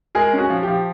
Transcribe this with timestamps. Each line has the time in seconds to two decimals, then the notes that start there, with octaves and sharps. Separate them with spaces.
0.15 G#3 G#4 A#4
0.33 C#4
0.38 F#4 G#4
0.50 F3
0.63 F3 G4